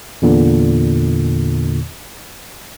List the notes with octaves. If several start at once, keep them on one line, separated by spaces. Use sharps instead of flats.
E2 A#2 D3